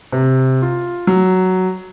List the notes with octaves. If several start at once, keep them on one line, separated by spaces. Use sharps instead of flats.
C3
F4
F#3